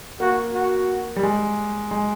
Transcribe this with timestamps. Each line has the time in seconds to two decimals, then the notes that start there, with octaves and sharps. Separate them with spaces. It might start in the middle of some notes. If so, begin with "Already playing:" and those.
0.20 A#3 F#4
0.54 F#4
1.16 G3
1.23 G#3
1.91 G#3